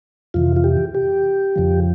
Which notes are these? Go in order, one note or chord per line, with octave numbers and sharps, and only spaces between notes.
F2 C3 E3 F4
F4
G4
G4
F2 C#3 F3